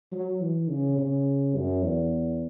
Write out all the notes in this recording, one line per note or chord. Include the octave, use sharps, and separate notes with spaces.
F#3
E3
C#3
C#3
F#2
E2